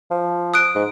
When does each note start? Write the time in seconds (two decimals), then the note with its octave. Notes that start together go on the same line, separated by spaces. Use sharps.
0.11 F3
0.54 D#6 F#6 D7
0.75 G#2